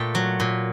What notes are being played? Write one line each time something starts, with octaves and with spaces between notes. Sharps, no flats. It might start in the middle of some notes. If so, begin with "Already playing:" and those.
Already playing: A#2 A3 G5
F#3
A#2